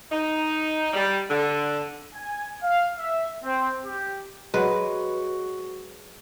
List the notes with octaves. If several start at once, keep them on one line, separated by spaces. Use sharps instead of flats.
D#4
G3
D3
G#5
F5
E5
C4
G4
F#3 G#3 F#4 B4